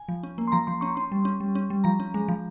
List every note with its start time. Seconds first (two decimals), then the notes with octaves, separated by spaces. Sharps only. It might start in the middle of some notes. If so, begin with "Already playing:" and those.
Already playing: G#5
0.09 F3
0.23 C#4
0.38 A#3
0.48 C6
0.52 F3 A#5
0.67 F3 C6
0.81 C#4 C#6
0.96 C#4 C6
1.12 G3
1.25 C#4
1.40 G3
1.55 C#4
1.70 G3
1.84 F3 A#5
2.00 C#4
2.14 G#3
2.28 F3